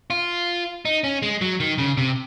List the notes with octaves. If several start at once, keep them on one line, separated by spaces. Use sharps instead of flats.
F4
D#4
C#4
G#3
F#3
D#3
C#3
C3